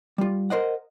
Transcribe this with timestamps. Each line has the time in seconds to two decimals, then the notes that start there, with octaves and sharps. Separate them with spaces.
0.18 G3 F4
0.50 A#4 C5 D#5 F#5